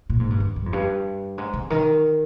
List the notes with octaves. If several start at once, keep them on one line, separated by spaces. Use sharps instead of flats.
A#2
G#2
G2
F2
G2
F2
G2
G#2
C3
D#3